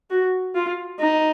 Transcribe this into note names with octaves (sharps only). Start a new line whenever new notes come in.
F#4
F4
D#4